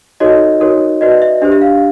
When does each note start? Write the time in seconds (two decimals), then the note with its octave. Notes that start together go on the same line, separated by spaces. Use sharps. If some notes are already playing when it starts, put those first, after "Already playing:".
0.20 D#4 F#4 A4 C#5 D#5
0.60 D#4 F#4 A#4 C#5
1.01 F#4 B4 D5 D#5
1.22 E5
1.42 D4 G4 C5 E5
1.52 E5
1.61 F5